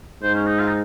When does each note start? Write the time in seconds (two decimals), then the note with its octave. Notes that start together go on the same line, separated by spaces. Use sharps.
0.23 G#2 C5
0.35 C#4
0.47 D#4
0.59 F4
0.67 D#4